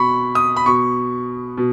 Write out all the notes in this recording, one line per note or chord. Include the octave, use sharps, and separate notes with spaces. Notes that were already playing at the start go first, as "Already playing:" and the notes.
Already playing: B2 B5 C#6
D#6
B5
B2 C#6
B2